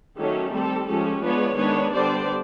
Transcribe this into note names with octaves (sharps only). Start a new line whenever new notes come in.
D#3 F#3 A3 C#4 G4 A4
G3 C4 G4 A4
F3 G#3 C#4 G4 A4
F3 G#3 B3 D4 B4 C#5
D#3 G#3 B3 D4 B4 C#5
D3 G3 B3 D4 C5 D5